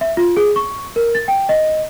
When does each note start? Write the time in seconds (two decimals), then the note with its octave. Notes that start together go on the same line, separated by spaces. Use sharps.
0.01 E5
0.17 F4
0.37 G#4
0.56 C#6
0.96 A#4
1.15 A6
1.28 G5
1.49 D#5